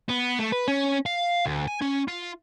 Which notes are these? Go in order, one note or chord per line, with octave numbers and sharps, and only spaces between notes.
B3
A3
B4
C#4
F5
D2
G#5
C#4
F4